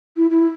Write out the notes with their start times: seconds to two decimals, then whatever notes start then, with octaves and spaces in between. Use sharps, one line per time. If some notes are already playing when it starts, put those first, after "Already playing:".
0.17 E4
0.31 E4